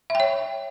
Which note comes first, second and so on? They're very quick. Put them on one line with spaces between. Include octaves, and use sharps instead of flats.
E5 G5 C#5